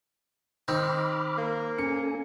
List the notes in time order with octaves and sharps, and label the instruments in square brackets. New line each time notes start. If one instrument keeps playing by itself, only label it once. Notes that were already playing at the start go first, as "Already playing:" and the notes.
[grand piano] D#3 [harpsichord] C4 D#4 [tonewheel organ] B5 D6 F6
[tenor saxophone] A#3
[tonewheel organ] C#4 A4 G#5 [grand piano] C#7